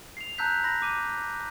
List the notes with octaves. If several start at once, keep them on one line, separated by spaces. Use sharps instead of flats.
C7 F7
A5 A#5 E6 F#6 G6 B6
B5 A#6
D6 D#7